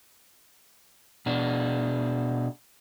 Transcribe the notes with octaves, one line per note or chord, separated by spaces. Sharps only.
B2 D4